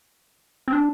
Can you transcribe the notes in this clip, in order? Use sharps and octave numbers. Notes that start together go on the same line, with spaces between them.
C4
D4